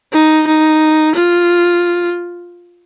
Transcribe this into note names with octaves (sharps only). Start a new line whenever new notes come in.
D#4
D#4
F4